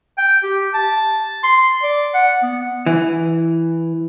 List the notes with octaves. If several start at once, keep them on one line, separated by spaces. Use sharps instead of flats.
G5
G4
A5
C6
D5
F#5
B3
E3